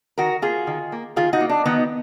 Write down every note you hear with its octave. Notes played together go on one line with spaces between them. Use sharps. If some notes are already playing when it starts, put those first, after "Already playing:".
D#3 F#4 A#4
A#3 F4 G#4
D#3
A#3
D#3 F4 G#4
D#4 F#4
A#3
D4
D#3 B3 D#4